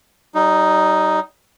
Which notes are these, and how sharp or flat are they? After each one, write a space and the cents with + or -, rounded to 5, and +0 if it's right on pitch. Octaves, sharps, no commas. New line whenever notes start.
G3 -35 D#4 +0